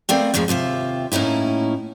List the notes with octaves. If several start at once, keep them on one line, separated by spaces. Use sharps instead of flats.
A3 B3 C4 A#4 D5 F5
F2 A#2 D#3 F3 G#3
D#2 C3 F4 E5
A2 A#3 C#4 D#4 E4